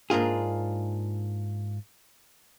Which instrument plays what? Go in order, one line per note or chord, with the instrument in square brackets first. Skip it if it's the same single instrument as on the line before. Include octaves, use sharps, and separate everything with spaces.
[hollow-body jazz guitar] G#2 A#3 D4 F4 G#4